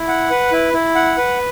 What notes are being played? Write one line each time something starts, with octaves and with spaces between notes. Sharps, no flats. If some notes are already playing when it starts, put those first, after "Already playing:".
Already playing: E4
F#5
B4
E4
E4
F#5
B4